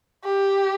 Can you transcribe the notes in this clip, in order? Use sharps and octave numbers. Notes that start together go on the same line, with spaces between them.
G4